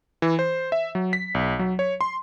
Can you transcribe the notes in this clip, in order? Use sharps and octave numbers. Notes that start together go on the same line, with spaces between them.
E3
C5
E5
F#3
B6
B1
F#3
C#5
C6